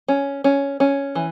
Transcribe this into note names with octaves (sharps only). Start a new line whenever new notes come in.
C#4
C#4
C#4
E3